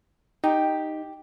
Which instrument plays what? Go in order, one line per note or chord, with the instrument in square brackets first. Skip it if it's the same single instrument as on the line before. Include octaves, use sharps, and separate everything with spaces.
[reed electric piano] D#4 [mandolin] G4